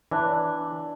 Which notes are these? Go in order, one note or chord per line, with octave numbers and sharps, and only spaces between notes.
E3 D4